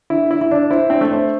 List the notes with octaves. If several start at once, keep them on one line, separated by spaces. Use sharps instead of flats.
D3 E4
D3 E4
E4
D3 D4
E4 C5
C4 D4
A3
C5